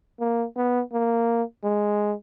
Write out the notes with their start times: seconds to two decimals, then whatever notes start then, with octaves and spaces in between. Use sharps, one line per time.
0.20 A#3
0.56 B3
0.93 A#3
1.64 G#3